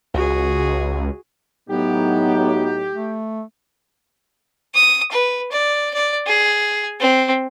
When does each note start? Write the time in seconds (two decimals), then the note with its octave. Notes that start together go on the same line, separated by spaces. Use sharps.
0.14 C#2 F#4 G#4
1.69 A2 F#3 B3 D#4 G4
2.92 A3
4.74 D#6
5.11 B4
5.52 D5
5.94 D5
6.27 G#4
7.00 C4